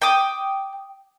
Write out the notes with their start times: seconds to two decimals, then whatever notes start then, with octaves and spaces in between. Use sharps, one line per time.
0.02 G5 D6 D#6